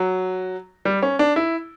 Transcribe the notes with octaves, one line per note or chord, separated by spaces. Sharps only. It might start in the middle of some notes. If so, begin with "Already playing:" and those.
Already playing: F#3
G3
C#4
D4
E4